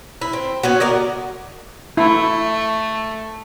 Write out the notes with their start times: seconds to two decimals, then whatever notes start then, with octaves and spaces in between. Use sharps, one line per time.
0.21 E4
0.33 C4
0.63 B3 C#4 F#4
0.80 A#4 D5 D#5
1.97 A3 E4